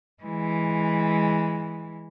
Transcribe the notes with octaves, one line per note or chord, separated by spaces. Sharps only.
E3 G#3